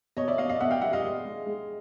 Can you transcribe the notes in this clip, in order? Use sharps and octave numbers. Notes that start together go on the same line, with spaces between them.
B2 C#5 D#5
D5 E5
B2 D#5 F5
D#5 F5
B2 E5 F#5
F5 G5
G3 E5 F#5
D#5 F5
G#3
G#3
G#3